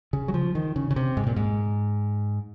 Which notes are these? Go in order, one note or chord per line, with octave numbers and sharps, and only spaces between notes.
C#3
F#3
F3
D#3
C#3
C#3
C3
G#2
A#2
G#2